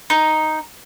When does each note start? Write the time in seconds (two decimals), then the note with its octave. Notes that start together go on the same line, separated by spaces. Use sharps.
0.10 D#4